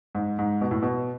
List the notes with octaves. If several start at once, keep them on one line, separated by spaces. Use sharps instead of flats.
G#2
G#2
B2
A2
B2